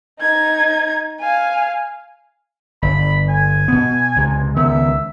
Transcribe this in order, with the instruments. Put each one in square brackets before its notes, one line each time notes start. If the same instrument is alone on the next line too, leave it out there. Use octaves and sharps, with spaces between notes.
[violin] D#4 G#6
F5 G#5
[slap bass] G1 [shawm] B5
[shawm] G#5
[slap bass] B2 B3
C#2 C3
[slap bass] C#2 D#3 B3 [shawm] E5